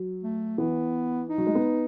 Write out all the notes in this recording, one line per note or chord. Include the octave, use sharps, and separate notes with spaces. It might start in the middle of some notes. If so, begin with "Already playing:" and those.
Already playing: F#3
A3
E3 B3
D#4
F#3
G#3
B3